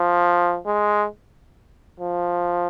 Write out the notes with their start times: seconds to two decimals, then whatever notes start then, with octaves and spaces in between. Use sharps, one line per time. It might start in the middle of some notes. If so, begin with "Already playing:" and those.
Already playing: F3
0.66 G#3
2.00 F3